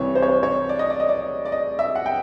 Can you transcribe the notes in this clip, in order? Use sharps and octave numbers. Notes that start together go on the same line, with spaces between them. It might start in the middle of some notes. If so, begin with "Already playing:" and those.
Already playing: C2 C3 E3 G3 C#5
C5
C#5
C5
C#5
D5
D#5
D5
D#5
D5
D5
D#5
E5
F#5
G5